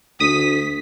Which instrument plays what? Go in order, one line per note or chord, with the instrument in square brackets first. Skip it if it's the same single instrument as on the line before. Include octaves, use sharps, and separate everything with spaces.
[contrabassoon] D2 [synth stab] D#6 [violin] B6